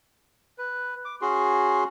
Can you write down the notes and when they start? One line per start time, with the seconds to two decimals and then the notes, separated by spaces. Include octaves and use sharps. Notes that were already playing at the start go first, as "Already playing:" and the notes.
0.58 B4
1.05 D6
1.22 C#4 F#4 G#4 C6